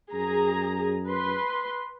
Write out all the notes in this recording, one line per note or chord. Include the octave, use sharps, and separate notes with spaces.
F#2 G#4 A#5
B4 C6